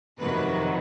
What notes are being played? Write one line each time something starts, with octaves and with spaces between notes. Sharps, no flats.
F2 C3 D#3 F#3 B4